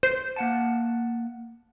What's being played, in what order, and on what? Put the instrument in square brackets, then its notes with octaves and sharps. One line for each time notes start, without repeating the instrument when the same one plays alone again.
[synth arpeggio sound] C5
[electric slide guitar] A#3 F#5 A5